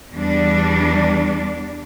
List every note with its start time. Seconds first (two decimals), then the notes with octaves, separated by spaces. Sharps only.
0.12 E2 G3 D4